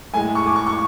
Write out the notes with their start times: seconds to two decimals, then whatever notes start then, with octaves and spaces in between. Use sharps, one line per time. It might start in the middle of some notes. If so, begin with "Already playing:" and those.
0.14 A2 G#3 G#5
0.35 C#6
0.46 D6
0.56 C#6
0.67 C#6